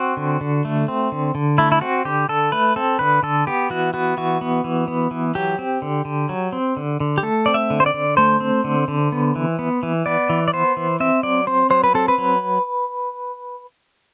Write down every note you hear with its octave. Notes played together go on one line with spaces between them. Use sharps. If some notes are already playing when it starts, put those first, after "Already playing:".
Already playing: C4 F#4
D3
D3
A3
C4
D3
D3
A3 E4
E4
C4 F#4
D3 G4
D3 A4
A3 B4
C4 A4
D3 B4
D3 A4
B3 G4
E3 F#4
B3 F#4
E3 F#4
B3
E3
B3
E3
F#3 G4
C4
D3
D3
F#3
C4
D3
D3
G4
A3 A4
C4 D5
E5
D3
C5
D5
D3
A3 C5
C4
D3
D3
B3
E3
B3
E3
B3 D5
E3
D5
B3 C5
E3
C4 E5
F#3 D5
C4 C5
F#3 C5
B4
C4 A4
B4
F#3